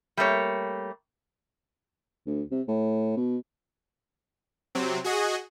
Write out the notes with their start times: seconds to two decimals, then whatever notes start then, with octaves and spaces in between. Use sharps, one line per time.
0.17 G3 A3 A#3 C#5
2.26 D2
2.51 C3
2.68 A2
3.17 B2
4.75 C3 F#3 C4
5.04 F#4 G#4 D#5